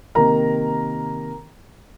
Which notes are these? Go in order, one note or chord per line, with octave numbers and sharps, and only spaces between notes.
C3 D#3 A#3 A#4 A#5